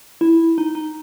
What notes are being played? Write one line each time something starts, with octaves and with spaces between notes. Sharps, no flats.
E4
D#4
D#4